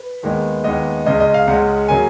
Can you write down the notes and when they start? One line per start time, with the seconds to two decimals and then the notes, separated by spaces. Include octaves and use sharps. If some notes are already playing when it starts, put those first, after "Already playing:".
Already playing: B4
0.23 D#2 D#3 G#3 B3
0.64 D#2 D#3 G#3 B3 D#5
1.06 C#2 C#3 G#3 D#5
1.20 D#5
1.34 F5
1.47 C#2 C#3 G#3 F#5
1.88 C#3 F#3 A#3 G#5